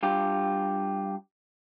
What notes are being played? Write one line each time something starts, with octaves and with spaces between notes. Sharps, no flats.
G2 F4 G4